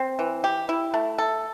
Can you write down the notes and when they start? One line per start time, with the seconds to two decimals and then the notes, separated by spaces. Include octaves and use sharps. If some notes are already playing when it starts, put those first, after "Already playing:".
Already playing: C4
0.19 E3
0.44 G4
0.69 E4
0.94 A3
1.18 A4